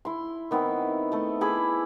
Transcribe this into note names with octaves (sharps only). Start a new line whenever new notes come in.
E4 C6
D#3 B3 C4 E4
A3 A4
E4 G#4 B5 D6